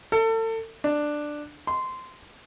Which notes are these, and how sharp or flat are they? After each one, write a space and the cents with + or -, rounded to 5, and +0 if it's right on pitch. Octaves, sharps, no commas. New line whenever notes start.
A4 +35
D4 +10
C6 -15